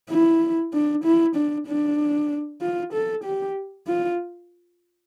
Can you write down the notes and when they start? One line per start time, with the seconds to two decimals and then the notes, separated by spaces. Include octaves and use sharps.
0.10 E4
0.73 D4
1.04 E4
1.36 D4
1.67 D4
2.62 F4
2.93 A4
3.24 G4
3.87 F4